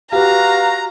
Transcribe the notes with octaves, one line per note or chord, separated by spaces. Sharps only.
F#4 G4 B4 F5 A#5